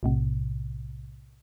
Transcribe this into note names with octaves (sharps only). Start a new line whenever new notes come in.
B1 A2 C3